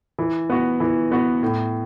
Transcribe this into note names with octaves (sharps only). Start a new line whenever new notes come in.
E3
B3 F#4
E3
B3 F#4
A2